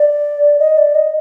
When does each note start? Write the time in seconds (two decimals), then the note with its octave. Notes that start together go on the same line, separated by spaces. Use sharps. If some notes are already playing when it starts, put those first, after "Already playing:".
Already playing: D5
0.59 D#5
0.77 D5
0.95 D#5